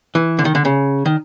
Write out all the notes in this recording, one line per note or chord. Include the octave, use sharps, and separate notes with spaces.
E3
D3
D#3
D3
C#3
D#3